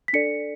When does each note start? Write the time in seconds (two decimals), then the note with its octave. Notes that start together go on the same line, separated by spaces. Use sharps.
0.08 B6
0.13 D4 A4 D5 C#7